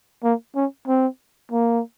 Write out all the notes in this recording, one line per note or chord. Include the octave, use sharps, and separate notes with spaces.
A#3
C#4
C4
A#3